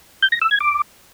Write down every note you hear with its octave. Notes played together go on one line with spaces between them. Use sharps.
G6
A#6
E6
G#6
D6